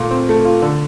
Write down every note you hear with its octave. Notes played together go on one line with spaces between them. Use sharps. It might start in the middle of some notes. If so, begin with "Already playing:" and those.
Already playing: A#2 A3 F4
C4
A3
F4
D3